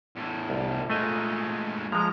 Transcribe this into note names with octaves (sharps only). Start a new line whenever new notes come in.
E2 A2
C2
A#2 G#3 A3 D#5 G#5
F3 G#3 A#5